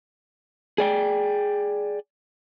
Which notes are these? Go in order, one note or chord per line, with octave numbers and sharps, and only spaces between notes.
G#4 D5 G5